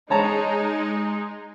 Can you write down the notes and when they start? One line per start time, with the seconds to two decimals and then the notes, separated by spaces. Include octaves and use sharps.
0.10 G#3 D#4 C#5 A5 A#5